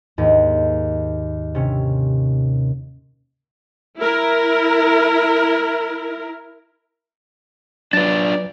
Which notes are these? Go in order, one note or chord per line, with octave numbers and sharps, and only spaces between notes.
D#2 G#2
C3 C#4
E4 A#4
F#3 D4 F4 B4 D5 A6